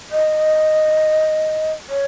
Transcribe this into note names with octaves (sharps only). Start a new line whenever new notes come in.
D#5
C#5